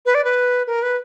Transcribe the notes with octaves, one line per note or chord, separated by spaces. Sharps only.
B4
D5
B4
A#4
B4